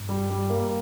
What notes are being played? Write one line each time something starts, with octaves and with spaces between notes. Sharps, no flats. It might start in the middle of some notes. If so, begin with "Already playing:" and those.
Already playing: G2
G3
G3
A#3